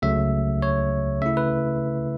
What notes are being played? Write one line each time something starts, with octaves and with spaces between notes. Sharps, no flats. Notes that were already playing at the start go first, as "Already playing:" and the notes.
C#2 C#3 F#3 A3 E5
C#5
C#3 A3 E4 E5
B4